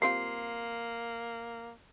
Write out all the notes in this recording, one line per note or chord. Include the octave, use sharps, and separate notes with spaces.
G3 A#3 C4 F4 C6 C7